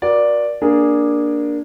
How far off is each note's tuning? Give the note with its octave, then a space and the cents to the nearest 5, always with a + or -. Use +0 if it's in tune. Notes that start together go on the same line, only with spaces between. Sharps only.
F#4 -25 A#4 +35 D5 +0
A#3 +15 D4 +0 G#4 -5